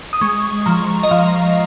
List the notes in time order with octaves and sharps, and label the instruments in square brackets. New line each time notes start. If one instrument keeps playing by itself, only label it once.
[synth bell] D#6
G#3 C#6
F3 A#5
D#5
F3 F5